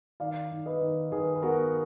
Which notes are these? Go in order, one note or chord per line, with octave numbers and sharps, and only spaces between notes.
D#3 D5 F5
D#3
B4 D#5
D#3
D#3 G#4 B4
B4
B3 F#4 A#4